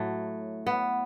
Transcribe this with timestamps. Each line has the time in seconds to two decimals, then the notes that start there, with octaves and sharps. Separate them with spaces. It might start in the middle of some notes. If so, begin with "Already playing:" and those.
Already playing: A2 F#3 A3
0.66 B3